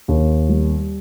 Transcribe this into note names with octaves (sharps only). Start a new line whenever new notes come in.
D#2
G3